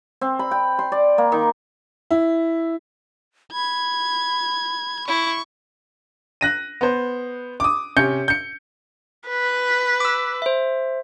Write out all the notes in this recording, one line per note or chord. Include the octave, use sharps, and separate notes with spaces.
C4
B5
G5
C6
D5
A#3
D#3
E4
B5 G#6
E4 C#6
F#6 A#6 D#7
B3 C5
D6 D#6
C3 C#4 G6 C#7
G6 C#7
B4
D6 E6
C5 E5